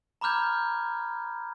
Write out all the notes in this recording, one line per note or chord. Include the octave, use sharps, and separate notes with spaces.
A#5 B5 D6 F6 G6 G#6